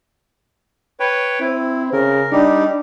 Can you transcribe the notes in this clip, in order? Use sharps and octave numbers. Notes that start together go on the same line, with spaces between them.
B4 C#5 G5
C4 E4
C#3 A#4
G3 D4 D#4 G4